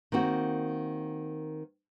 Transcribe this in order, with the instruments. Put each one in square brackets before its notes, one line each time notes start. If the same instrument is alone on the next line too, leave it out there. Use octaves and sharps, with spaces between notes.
[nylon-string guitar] D#3 A#3 C4 F#4